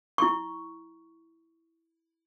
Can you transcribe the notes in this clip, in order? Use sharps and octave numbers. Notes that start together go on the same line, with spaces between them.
E4 C#6